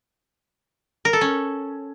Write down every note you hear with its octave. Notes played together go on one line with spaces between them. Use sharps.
A#4
A4
C#4